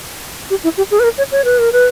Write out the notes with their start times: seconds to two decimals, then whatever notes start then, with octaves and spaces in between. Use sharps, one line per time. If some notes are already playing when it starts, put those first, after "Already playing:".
0.50 G4
0.64 E4
0.77 G4
0.91 G#4
0.99 B4
1.04 A#4
1.18 C#5
1.32 C#5
1.44 B4
1.59 A#4
1.73 B4